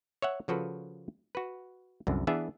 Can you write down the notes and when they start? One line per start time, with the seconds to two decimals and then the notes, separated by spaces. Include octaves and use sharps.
0.22 C#5 E5 F#5
0.48 C#3 F3 F#4 A4 B4
1.35 F#4 B4
2.07 C2 F#2 D3
2.27 E3 B3 D4 G#4 E5